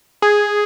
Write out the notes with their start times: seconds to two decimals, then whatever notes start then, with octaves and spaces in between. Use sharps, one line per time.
0.22 G#4